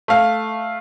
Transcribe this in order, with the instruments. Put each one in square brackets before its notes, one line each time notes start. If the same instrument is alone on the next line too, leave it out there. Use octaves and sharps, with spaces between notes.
[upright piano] A3 F5